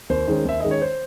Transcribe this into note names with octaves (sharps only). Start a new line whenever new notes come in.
D#2 C5
D#3 G#3 C#4
D#2 E5
D#3 G#3 C#4 D#5
C#5
C5